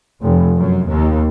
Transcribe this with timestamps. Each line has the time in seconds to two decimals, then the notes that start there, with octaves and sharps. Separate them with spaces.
0.22 F1
0.57 F#2
0.88 D#2